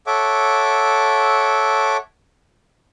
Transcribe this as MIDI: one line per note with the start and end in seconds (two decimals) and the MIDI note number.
0.07 1.97 69
0.07 1.97 73
0.07 1.97 76
0.07 1.97 78
0.07 1.97 86